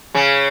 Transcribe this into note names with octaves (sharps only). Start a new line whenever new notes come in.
C#3 C#4